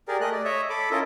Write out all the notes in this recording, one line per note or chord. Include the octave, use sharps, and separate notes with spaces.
G4 G#4 A#4 D5
A3 D#5 F#6
D5
C#5 D#5 E5
A4 B5 D6
C#4 E4 F4 A4 A#4 D#5